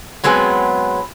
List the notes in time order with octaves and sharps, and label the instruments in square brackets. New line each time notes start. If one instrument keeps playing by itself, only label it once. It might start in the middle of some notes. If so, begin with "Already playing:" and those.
[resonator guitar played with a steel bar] F#3 G#3 B3 C4 G#4